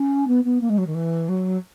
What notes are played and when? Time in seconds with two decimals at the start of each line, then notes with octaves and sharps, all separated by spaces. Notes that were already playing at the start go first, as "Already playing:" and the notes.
Already playing: C#4
0.27 B3
0.44 B3
0.61 A#3
0.69 G#3
0.77 F#3
0.86 D#3
0.94 E3
1.28 F#3